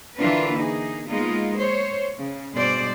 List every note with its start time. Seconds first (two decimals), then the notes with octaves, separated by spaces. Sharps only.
0.18 D3 E3 D4 F4 A#4 B4
0.55 A#3 D#4 G#4
1.07 G#3 A#3 B3 D#4 F4
1.57 C5 C#5
2.18 C#3
2.53 G2 B2 G#3 C5 D5